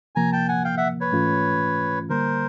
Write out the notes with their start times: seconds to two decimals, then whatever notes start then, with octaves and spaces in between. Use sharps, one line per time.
0.16 C3 F3 A#3 G#5 A#5
0.32 G5 A5
0.48 F#5 G#5
0.64 F5 G5
0.77 E5 F#5
1.01 B4 C#5
1.13 G#2 E3 A3 C#4 F4
2.10 D3 G3 A#3 A#4 C5